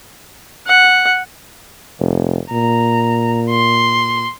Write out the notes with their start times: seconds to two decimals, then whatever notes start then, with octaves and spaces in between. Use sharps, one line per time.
0.67 F#5
2.00 F1
2.51 A#2 A#5
3.50 C6